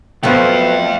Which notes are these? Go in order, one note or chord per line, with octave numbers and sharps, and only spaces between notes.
F3 F#3 A3 B3 B4 C5 F5 G5